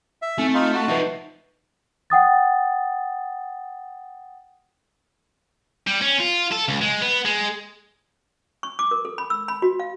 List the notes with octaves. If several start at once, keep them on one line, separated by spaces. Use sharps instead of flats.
E5
A3 C4
D#4 F4
F#4 A5
F3 D#4 B4 E5 F#5
F#5 G5 D#6 A6
G3
C#4
F4
A4
C#2
G#3
B3
G#3
C#6
D6
A#4
A4
B5
E6
B5
F#4
F5